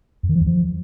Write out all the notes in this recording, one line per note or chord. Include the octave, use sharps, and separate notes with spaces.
F2
D#3
F3
E2
F3